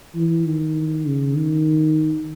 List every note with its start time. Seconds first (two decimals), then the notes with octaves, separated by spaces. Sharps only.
0.16 E3
0.46 D#3
1.07 C#3
1.37 D#3